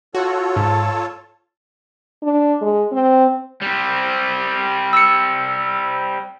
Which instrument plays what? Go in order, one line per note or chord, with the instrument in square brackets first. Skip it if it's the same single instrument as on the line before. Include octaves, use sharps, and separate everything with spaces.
[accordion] F4 A4 C#5 [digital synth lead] F#4
[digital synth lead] G#2 [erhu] A5
[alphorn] D4
G#3
C4
[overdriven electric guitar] G3 C4
[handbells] E6 C#7